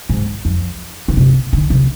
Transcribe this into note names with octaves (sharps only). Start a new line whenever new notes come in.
G#2
F2
D3
C3
D3
C3